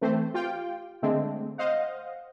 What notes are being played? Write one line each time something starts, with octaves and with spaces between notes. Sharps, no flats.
E3 A3 C4 C5
F4 G4 F5 G5
D3 G#3 A3 C4 D4
C5 D#5 F5 F#5